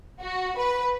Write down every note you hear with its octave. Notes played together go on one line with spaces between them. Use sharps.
F#4
B4